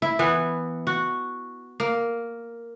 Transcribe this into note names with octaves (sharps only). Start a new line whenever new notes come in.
E4
E3 B3
F#4
A#3